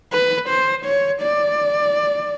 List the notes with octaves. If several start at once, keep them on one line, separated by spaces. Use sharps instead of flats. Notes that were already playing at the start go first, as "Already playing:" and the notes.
B4
C5
C#5
D5